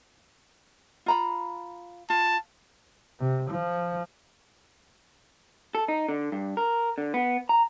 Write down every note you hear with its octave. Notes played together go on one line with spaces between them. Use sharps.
F4 A#5 B5
F4 A5
C3
F3
A4
D#4
D3
G2
A#4
D3
B3
A#5